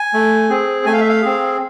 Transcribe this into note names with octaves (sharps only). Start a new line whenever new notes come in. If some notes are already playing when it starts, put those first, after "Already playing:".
Already playing: G#5
A3
C4 G#4
A3 G#5
F5
E5
F5
C4 G#4